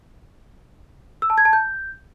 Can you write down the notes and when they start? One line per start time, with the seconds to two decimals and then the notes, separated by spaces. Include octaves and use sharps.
1.22 E6
1.30 A5
1.38 G#6
1.45 A5
1.53 G6